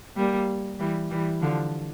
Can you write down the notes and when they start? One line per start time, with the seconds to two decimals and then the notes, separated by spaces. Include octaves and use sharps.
0.17 G3 A#3
0.79 E3 G3
1.10 E3 G3
1.41 D3 F3